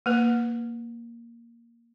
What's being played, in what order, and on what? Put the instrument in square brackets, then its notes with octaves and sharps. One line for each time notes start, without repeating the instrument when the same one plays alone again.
[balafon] A#3 B4